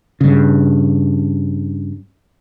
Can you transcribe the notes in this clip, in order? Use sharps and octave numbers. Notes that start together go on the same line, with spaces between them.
G2 C#3